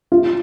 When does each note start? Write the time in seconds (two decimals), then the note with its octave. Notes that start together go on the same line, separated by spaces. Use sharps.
0.12 F4